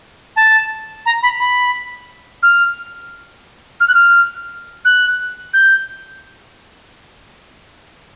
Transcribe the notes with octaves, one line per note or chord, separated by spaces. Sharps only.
A5
A#5
B5
B5
F6
F6
F#6
F6
F#6
G6